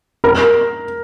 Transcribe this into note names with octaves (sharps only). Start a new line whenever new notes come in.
A#4